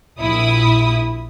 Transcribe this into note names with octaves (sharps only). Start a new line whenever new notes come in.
A#1 E4 D#6